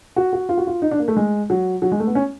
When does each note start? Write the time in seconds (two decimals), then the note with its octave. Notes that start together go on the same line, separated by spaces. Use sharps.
0.16 F#4
0.33 F#4
0.49 F4
0.57 F#4
0.67 F4
0.82 D#4
0.91 D4
1.00 A#3
1.08 A3
1.16 G#3
1.50 F#3
1.82 F#3
1.92 G#3
2.00 A3
2.07 B3
2.15 C#4